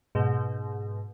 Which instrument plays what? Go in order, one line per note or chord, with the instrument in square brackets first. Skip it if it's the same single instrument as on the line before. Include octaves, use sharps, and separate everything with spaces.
[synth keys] G#2 B2